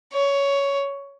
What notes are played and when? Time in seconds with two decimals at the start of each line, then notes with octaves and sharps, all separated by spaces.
0.13 C#5